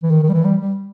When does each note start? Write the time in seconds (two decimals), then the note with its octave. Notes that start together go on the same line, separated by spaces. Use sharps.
0.03 E3
0.11 D#3
0.23 D#3
0.29 G3
0.34 E3
0.45 G3
0.62 G3